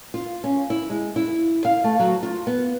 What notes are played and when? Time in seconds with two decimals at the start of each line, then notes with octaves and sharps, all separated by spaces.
0.14 F4
0.44 C#4
0.70 E4
0.90 G#3
1.16 E4
1.65 F5
1.84 A3
2.00 F#3
2.23 F4
2.47 B3